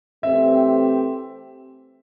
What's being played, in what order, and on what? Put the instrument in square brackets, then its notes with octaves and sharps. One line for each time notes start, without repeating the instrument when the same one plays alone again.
[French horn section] E3 A3 C4 G4 [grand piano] E5